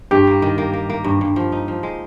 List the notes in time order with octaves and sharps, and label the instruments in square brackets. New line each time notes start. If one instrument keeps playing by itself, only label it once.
[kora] G2 [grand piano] G4
[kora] A#3
D#3
A#3
A#3
A#3
G2
G2
F3
D#4
F3
G#3